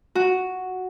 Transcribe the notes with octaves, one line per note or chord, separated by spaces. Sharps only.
F#4